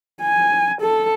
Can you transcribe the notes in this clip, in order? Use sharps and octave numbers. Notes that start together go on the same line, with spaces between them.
G#5
A4